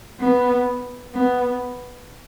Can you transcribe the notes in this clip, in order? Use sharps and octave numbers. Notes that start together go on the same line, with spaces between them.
B3
B3